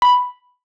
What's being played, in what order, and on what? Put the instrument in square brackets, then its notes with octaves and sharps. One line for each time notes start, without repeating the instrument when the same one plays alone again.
[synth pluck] B5